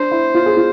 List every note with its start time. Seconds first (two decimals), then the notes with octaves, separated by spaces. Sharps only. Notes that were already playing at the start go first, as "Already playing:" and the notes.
Already playing: D4 C5
0.11 E4
0.35 F4
0.46 G#4
0.57 F4